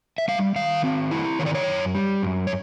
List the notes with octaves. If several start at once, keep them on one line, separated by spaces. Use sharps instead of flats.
E5
G3 F5
D#3 F5
C4
E4
D#3 C#5
D5
C#5
F#2
G3
F#2
C#5